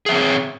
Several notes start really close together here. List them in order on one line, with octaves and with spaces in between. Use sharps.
G#4 E5 C4 C#5